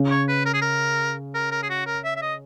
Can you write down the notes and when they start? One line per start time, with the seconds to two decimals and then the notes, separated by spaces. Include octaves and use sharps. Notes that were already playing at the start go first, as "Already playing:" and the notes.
Already playing: C#3
0.10 C#5
0.28 B4
0.45 A#4
0.54 G#4
0.61 A#4
1.34 A#4
1.51 A#4
1.63 G#4
1.69 F#4
1.86 A#4
2.04 E5
2.16 E5
2.22 D#5